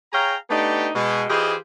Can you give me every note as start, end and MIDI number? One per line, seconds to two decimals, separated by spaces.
0.13 0.36 68
0.13 0.36 73
0.13 0.36 77
0.13 0.36 79
0.13 0.36 82
0.50 0.89 57
0.50 0.89 59
0.50 0.89 62
0.50 0.89 63
0.50 0.89 67
0.95 1.23 47
0.95 1.23 56
1.30 1.55 52
1.30 1.55 65
1.30 1.55 67
1.30 1.55 68
1.30 1.55 72
1.30 1.55 75